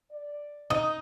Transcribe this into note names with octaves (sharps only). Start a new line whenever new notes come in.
D5
D#4 D#6